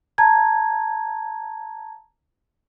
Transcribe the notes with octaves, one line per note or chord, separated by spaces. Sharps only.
A5 A#5 G#6